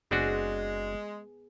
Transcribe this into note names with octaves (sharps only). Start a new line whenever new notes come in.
F#1 G#3 B3 C4 D4 F#4 G#4